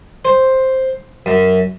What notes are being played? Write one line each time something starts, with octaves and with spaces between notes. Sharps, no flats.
C5
F#2